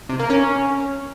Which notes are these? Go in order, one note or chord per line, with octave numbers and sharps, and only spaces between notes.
C3
A#3
C#4